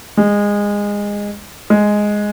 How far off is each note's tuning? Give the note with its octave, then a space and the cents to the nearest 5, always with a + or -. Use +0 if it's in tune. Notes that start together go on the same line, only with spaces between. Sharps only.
G#3 -20
G#3 +0